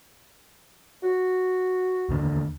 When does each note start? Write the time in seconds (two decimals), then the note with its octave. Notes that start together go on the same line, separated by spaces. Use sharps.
1.03 F#4
2.09 D#2 D3